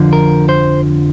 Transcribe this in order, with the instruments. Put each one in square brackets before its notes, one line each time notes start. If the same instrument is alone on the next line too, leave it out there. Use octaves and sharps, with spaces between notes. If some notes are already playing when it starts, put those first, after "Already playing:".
Already playing: [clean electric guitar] F2 D3 F3
A#4
C5